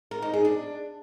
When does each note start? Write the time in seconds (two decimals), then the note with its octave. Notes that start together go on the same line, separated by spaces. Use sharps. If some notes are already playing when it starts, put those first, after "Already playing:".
0.11 A#4
0.22 D#4
0.34 G#4
0.45 D4